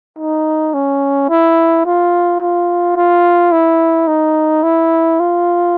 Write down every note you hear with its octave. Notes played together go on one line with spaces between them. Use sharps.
D#4
C#4
E4
F4
F4
F4
E4
D#4
E4
F4